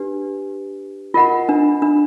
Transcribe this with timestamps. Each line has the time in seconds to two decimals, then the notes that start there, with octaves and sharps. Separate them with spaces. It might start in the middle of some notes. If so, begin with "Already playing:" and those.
Already playing: D4 G4 B4
1.14 F4 A#4 D#5 F#5 B5
1.49 D4
1.82 D4